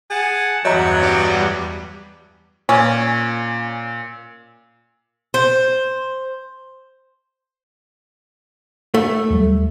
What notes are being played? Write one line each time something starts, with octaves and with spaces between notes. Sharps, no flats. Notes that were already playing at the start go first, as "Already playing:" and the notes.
G#4 F#5 A5
E2 G2 F#3 B3 C#5 D#5 A#5
G3 D5
A#2 C#4
C5
A3
D#2 F#3 G3